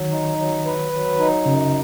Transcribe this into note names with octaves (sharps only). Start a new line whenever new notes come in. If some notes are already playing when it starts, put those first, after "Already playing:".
Already playing: D#3 F#3
D#4
F#3
B4
F#3
D#4
F#2 C#3